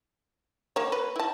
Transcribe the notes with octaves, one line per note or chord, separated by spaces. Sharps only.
A#3 C#5
B4
E4 A5